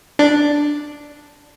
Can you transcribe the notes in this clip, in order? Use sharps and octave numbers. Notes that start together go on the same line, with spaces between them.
D4